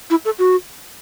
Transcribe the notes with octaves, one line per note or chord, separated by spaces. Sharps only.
E4
A4
F#4